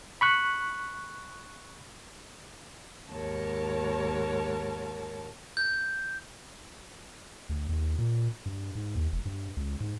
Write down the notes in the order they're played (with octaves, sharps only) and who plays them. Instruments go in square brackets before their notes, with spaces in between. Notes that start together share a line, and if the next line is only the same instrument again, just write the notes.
[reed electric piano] B5 C#6 F#6
[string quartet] D#2 G#2 A#4 C#5 A5
[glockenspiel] G6
[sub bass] D2
D#2
A#2
G2
G#2
D#2
F1
G2
C#2
G#2